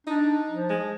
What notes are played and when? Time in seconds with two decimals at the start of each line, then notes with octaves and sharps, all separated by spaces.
0.07 D4 D#4
0.52 F3
0.70 G#3